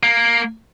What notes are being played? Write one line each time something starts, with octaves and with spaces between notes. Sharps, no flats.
A#3